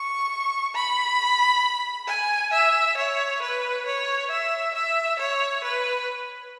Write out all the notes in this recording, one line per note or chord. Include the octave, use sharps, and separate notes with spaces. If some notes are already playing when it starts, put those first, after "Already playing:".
Already playing: C#6
B5
G#5
E5
C#5
B4
C#5
E5
E5
C#5
B4